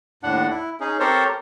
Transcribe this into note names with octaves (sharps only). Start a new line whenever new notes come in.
D#2 A2 D4 F#5
E4
C#4 D#4 G#4
C4 G4 A4 A#4 C5 C#5